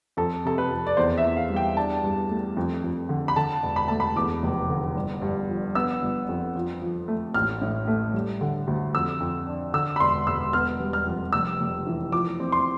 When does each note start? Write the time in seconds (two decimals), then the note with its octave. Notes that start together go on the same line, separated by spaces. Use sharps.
0.17 F2 A4
0.45 C3 A4
0.58 B4
0.71 F2
0.87 D5
0.97 E2 C5
1.18 E5
1.24 E2
1.37 F5
1.50 G3
1.56 G5
1.77 D4 A5
2.04 G2
2.30 A3
2.57 F2
2.84 F2
3.09 D3
3.28 B5
3.36 D3 A5
3.63 E1
3.76 B5
3.88 A3 A5
4.00 B5
4.16 E2 D6
4.43 F1
4.69 D3
4.95 G1
5.22 G2
5.48 F3
5.75 B3 E6
6.01 G1
6.29 F2
6.56 F3
6.82 F3
7.08 A3
7.34 A1 F6
7.62 A2
7.88 A3
8.14 G3
8.41 D3
8.67 D2
8.94 F2 E6
9.20 F2
9.47 D4
9.74 D3 E6
9.96 B5
10.00 E1 C6
10.27 E1 E6
10.53 B3 F6
10.80 G3
10.93 F6
11.06 F2
11.33 F1 E6
11.60 F1
11.87 E3
12.12 F3 D6
12.40 C4
12.52 C6